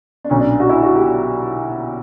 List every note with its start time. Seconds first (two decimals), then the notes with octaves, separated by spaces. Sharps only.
0.24 D4
0.30 B1 A#2 C#4
0.40 D4
0.60 F#4
0.69 E4
0.82 F#4
0.95 G4